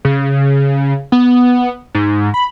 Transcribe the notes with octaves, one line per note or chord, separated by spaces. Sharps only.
C#3
B3
G#2
B5